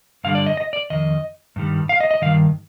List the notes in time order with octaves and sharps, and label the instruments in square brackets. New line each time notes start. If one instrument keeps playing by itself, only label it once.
[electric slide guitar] G2 D3 G3 F5
D5
D#5
D#5
D5
F2 D#3 D#5
G2 D#3 G3
F5
D#5
D#5
G2 D#3 F5